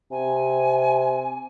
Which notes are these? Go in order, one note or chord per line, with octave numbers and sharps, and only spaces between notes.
C3 G#5